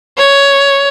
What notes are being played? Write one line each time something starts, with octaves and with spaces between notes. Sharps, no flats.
C#5